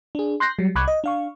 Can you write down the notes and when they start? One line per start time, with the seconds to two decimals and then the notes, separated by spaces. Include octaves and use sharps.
0.15 D4 G#4
0.40 C6 F#6 G6 A#6 C7
0.59 F#3 G3
0.75 C2 B5 C#6 D6 F#6 G#6
0.88 D#5
1.04 D4 F5 C#6